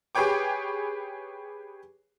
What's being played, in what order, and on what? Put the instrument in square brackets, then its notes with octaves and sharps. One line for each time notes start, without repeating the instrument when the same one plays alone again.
[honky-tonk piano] G4 G#4 B4 C#5 G5 D6